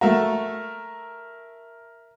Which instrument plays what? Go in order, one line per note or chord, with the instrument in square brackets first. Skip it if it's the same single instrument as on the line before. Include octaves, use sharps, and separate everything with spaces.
[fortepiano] A3 F#4 [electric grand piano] A#4 E5 A#5